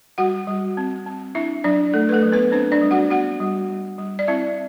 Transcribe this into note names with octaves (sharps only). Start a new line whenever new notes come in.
G3 F#4 F#5
G3
C4
C4
D4 E4 E5
F#3 D4 D5
A3 A4
B4
A3 A4
F#3
B3 B4
C4 D4 C5
D4 D5
G3
F#4 F#5
B3 F#4 F#5
G3
G3
G3
D5
C4 E4 E5